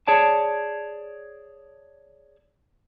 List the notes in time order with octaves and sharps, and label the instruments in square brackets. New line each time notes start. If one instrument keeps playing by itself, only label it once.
[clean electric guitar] G#4 C#5 D5 A5